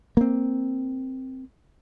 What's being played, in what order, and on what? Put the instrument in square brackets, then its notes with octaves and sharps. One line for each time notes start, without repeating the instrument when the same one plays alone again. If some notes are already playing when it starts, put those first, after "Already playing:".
[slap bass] A#3 C4